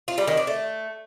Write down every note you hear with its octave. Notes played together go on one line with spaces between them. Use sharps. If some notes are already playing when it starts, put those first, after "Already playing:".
F4
G3
D#3
D4
A3